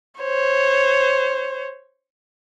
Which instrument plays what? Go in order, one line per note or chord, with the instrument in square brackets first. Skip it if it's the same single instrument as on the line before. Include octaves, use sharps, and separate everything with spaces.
[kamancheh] C5 C#5